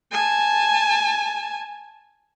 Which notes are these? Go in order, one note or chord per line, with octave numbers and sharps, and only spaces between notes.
G#5 A5